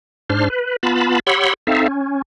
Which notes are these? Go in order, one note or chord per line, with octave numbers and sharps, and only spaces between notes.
G#2 D4 C5 F6
B4
B3 F4 A5 B5
G4 C#5 F#5 B5 C6 E6
C4 D#4 A4 E5 F5
C#4